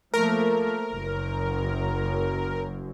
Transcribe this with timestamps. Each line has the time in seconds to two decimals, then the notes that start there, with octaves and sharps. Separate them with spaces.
0.14 F3 A3 A#3 A#4
0.90 F#1 F#2